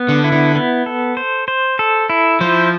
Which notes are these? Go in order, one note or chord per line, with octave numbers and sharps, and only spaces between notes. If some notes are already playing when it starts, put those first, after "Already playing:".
Already playing: B3
D3
E4
D3
B3
A4
C5
C5
A4
E4
F3 C5